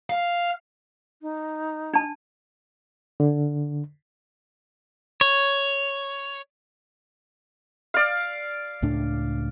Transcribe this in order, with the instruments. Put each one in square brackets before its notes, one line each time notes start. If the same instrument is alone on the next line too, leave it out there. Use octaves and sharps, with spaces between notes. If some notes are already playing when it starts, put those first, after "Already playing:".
[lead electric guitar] F5
[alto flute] D#4
[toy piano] D4 A5
[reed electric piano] D3
[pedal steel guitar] C#5
[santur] D5 F5
[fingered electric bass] C#2 A2 D4